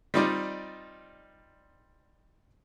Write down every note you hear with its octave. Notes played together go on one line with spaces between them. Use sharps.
G3 C4 D#4 F4 D5 D#5